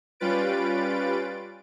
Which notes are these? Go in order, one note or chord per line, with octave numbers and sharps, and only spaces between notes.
G3 C#4 F4 B4 A6 D7